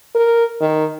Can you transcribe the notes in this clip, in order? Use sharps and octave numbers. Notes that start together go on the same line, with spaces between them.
A#4
D#3